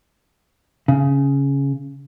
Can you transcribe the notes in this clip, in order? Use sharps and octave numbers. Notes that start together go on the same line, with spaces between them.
C#3